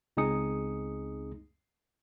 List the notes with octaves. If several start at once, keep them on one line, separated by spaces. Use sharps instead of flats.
C#2 C4 D#4 G#4 D#6 C#7